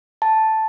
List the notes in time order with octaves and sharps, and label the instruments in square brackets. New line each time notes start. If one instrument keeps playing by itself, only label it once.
[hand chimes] A5